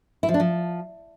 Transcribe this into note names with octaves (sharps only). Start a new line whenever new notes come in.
E4
F3
D4
F3